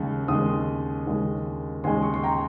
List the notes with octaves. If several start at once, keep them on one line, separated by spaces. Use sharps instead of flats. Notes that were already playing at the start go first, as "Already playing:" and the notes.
Already playing: D#2 C#3 G#3
D#2 C#3 G#3 C6 D#6
D#2 C#3 G#3
D#2 C#3 G#3 G#5 C6
C#6
C6
G5 A#5